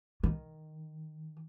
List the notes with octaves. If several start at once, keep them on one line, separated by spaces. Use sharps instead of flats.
D#3